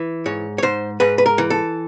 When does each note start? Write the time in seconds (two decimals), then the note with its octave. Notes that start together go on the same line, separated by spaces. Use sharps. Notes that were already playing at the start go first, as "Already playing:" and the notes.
Already playing: E3
0.26 G#2 C#5
0.58 C#5
0.62 G#2 C5
1.00 G#2 B4
1.18 B4
1.26 A#4
1.38 E3
1.50 A4